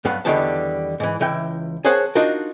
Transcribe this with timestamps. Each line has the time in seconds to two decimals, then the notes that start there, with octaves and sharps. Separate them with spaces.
0.05 G2 F#3 B3 F5 F#5
0.25 E2 D3 D#3 G3 B3 A5
1.00 G#2 E3
1.20 C#2 E3 E4 G5
1.85 G#4 A#4 C5 C#5 F#5 A5
2.15 D4 D#4 F4 F#4 A#4